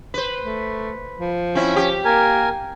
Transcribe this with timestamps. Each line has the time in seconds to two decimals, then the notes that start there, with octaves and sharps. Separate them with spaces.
0.14 B4 C5
0.44 A3
1.18 F3
1.55 C4 C#4 E4
1.76 G4
2.05 A#3 A#4 G#5